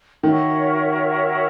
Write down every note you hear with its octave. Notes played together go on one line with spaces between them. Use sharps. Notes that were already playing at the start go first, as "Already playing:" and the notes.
D#3 F#4 A#4 C#5 E5